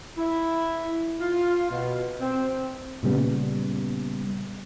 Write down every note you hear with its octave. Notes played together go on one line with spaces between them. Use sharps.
E4
F4
B2
C4
A#2 C#3 G3 B3